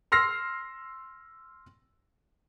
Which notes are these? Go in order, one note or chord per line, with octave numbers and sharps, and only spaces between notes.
C6 E6 F6 A#6 C7